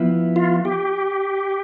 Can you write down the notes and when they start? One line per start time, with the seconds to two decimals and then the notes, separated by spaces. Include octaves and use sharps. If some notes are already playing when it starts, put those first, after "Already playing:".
Already playing: F3 B3 E4
0.36 F4
0.65 G4